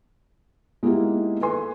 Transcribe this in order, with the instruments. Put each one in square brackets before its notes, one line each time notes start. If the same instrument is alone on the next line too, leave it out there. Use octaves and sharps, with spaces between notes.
[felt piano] G#3 A#3 B3 D#4 E4 G4
A4 B4 G#5 C6